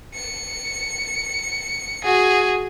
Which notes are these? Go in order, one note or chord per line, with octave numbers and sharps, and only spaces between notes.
C#7
F#4 G#4